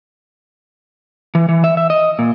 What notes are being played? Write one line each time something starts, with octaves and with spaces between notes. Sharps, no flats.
E3
E3
E5
E5
D#5
A#2